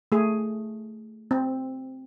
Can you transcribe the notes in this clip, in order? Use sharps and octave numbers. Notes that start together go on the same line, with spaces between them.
A3 G#4
C4